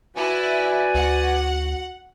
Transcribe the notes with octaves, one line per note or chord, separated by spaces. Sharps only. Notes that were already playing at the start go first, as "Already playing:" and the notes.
E4 F#4 B4 D5 G#5
D2 F#5